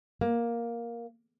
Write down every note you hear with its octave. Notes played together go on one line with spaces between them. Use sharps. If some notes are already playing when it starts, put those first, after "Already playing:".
A#3